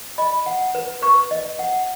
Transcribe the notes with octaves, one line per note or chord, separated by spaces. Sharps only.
D#5 B5
F#5
B4
B4 C#6
D#5
F#5